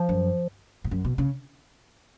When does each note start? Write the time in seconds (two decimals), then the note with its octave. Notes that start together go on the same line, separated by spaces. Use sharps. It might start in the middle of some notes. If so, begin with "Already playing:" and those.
Already playing: F3
0.09 F#2
0.84 G#2
0.91 F#2
1.04 B2
1.18 C#3